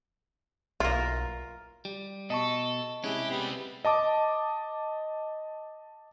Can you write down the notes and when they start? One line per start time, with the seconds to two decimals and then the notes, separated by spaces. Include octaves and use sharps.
0.80 B1 A#3 E4 F4 A#4
1.85 G3
2.30 B2 A4 D#5 A5 C#6
3.04 C3 G#3 C#4 E4 G4 G#4 F#6
3.30 G3 B3 C4 G4 B5
3.85 D#5 A5 D6 D#6